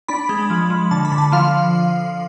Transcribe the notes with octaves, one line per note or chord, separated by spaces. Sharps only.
D4 B5
G#3
F3
F3
D3 A5
B5
D3
A5
F3 F5